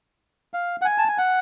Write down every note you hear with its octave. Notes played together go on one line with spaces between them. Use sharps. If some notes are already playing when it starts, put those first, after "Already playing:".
F5
F#5
G#5
A5
G#5
F#5